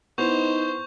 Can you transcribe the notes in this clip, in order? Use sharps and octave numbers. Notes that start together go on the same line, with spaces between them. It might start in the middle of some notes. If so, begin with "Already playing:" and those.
B3 D#4 E4 C5 C#6 G6 F7